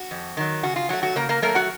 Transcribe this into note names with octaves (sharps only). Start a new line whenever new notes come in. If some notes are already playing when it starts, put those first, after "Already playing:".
Already playing: F#4
F2
D#3 F#3
C#3 F#4
F4
F#3 A3 F#4
F#4
C#3 A#3 A#4
A#3 A#4
F#3 A3 A#3 A#4
F#4 F#5